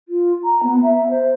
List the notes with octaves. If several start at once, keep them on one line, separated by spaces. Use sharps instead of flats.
F4
A#5
B3
E5
C5